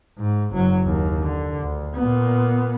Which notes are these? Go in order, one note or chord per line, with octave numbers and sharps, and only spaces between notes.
G#2
F#1 F#3
D#2
D3
D2
A#2 B3